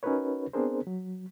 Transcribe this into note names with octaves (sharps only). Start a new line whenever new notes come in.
C#4 D#4 F#4 A#4 B4 C#5
B3 C4 D4 G#4 A#4 C5
F#3